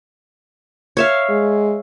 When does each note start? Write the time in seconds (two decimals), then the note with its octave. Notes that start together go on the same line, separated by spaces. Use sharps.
0.97 C#5 E5 F5
1.29 G#3